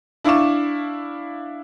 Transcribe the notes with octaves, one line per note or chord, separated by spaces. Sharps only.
D4 E4 F5 C#6 D6 E7